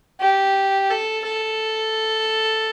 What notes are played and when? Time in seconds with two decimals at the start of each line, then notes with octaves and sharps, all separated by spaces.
0.20 G4
0.90 A4
1.26 A4